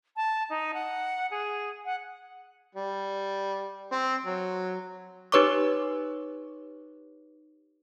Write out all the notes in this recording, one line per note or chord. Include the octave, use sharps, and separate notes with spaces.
A5
D#4
F#5
G#4
F#5
G3
C4
F#3
D#4 G4 B4 C#5 C#6 D6